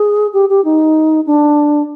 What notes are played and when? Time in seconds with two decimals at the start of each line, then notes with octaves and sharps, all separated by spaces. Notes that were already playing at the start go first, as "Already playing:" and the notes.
Already playing: G#4
0.33 G4
0.49 G4
0.65 D#4
1.26 D4